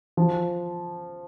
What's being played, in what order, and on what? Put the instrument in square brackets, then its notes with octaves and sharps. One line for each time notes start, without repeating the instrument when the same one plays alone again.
[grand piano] F3